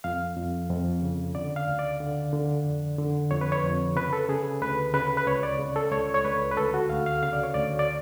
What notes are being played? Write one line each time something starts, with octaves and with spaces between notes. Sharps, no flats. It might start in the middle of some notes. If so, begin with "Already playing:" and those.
F2 F5
F2
F2
C#3
D3 D5
F5
D2
D5
D3
D3
F2
D3
F2 C#5
B4
C#5
F2
C#3 B4
A4
C#3 G#4
D2 B4
C#3 B4
B4
C#2 C#5
D5
C#3
A4
C#2 C#5
C#5
C#2 B4
B4
D2 A4
F#4
D2 F5
F5
C#3 F5
D5
C#5
D2 D5
D5